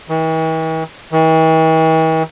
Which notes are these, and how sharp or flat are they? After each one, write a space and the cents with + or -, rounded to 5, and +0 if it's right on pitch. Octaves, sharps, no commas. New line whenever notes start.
E3 -45
E3 -45